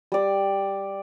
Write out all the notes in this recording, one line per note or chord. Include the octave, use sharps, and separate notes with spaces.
G3 D5